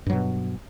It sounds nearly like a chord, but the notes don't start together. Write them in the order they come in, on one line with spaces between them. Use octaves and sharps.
G2 F#3 B2